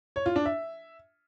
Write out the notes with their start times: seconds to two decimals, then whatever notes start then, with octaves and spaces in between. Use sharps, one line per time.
0.16 C#5
0.26 F4
0.36 D4
0.46 E5